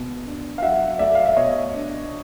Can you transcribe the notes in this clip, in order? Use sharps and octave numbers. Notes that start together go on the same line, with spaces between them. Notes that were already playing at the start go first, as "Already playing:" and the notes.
Already playing: B2
D4
F5
F#3 E5 F#5
A3 D5 E5
F5
E5
B2 C#5 D#5
D4